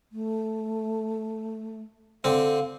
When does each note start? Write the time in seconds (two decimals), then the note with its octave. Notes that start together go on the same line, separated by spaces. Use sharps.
0.12 A3
2.24 D3 C4 F5